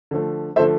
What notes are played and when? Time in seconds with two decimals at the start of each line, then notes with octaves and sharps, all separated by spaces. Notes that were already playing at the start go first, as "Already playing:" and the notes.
0.11 D3 F3 A3
0.56 D3 F3 A3 C5 E5